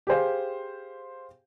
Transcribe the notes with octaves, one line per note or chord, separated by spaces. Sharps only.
G4 G#4 C5 F5